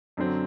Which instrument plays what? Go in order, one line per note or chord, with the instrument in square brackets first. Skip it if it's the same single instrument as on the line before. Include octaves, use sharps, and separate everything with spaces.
[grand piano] F#2 D3 F#3 C4